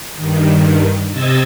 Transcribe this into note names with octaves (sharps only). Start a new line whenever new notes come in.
G2 D#3
C3 D#5 E6 G#6 A6